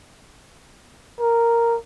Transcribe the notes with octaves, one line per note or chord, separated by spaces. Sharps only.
A#4